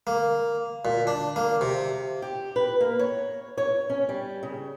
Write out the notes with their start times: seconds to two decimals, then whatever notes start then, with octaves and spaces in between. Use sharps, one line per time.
0.07 A#3
0.85 A#2
1.07 D4
1.36 A#3
1.61 C3
2.22 G4
2.56 B4
2.80 A#3
2.99 C#5
3.58 C#5
3.90 C#4
4.09 G3
4.43 C#3